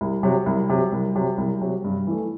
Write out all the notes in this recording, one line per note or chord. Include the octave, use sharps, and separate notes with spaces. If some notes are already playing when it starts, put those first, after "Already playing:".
C2
C3 F#3
C2
C3 F#3
C2
C3 F#3
C2
C3 F#3
G2
E3 A3